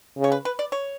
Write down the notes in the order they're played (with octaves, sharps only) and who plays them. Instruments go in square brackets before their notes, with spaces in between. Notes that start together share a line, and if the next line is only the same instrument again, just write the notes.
[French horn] C#3
[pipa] C#5
B4
B4
D5
C#5